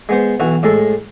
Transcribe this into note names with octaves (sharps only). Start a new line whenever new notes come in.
G#3 B3 C5
B1 E3 F#4
A2 G#3 A4